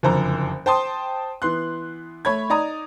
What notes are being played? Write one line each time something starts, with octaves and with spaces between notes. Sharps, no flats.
F#1 F2 D3 C5 A#5
C5 G5 A5 C6 D#6
E3 B3 C6 F#6
A3 C#5 B5 G#6
D#4 D5 A#5 D#6